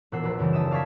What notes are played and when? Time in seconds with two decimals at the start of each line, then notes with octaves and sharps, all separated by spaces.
0.12 E1 A#2 B3 F#5 E6 C7
0.24 A#1 B4
0.39 F#2 C#3 E3 G3
0.53 D#1 A4 E5 D#6 D#7 E7
0.71 D5 F5 A5 C#6 G#6 B6